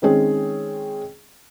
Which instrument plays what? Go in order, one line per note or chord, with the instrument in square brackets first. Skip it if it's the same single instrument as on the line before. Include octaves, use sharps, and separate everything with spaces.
[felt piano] D#3 G#3 C4 C#4 G#4 C#5